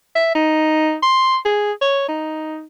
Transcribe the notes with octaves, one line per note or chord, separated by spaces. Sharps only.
E5
D#4
C6
G#4
C#5
D#4